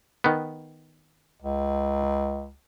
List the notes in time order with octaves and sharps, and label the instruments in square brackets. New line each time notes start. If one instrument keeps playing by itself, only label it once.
[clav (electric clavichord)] D#3 B3
[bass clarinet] C#2